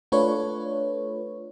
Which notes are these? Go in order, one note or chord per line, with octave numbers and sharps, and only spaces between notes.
A3 D4 F4 B4 C#5